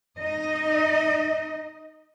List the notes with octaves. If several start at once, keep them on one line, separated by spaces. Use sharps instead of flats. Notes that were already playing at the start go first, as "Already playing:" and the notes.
D#4 D#5